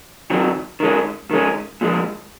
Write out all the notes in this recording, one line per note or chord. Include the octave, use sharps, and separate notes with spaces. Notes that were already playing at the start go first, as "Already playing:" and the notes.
D#3 F#3 C4
D#3 G#3 C#4
D#3 G#3 C#4
A#2 F3 G#3